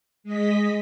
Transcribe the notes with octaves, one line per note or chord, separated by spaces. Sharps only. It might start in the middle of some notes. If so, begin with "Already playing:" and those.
G#3 D#5 B6